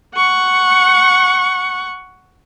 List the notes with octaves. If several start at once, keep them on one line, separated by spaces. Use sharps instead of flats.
F#5 C#6